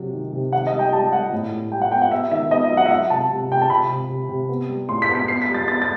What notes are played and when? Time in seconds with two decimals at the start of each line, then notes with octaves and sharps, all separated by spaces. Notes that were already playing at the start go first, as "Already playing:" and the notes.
Already playing: C3 F#3
0.13 D#3
0.33 C3
0.53 D#3 F#5
0.67 D#5
0.73 G3
0.79 G5
0.92 G3 A5
1.12 G3 F#5
1.32 A2
1.51 A2
1.71 G3 G5
1.81 F#5
1.92 B3 G5
2.02 F#5
2.11 B3 E5
2.31 D#3 E5
2.51 B3 D#5
2.64 E5
2.71 F#3
2.77 F#5
2.86 E5
2.91 F#3 F#5
3.10 C3 A5
3.30 C3
3.51 C3 G5
3.62 A5
3.70 C3 B5
3.90 C3
4.09 C3
4.29 C3
4.49 B3
4.69 G3
4.89 A2 C6
5.02 B6
5.09 B3
5.15 B6
5.28 B3 C7
5.42 B6
5.48 G3
5.54 A6
5.68 B3 A6
5.82 A6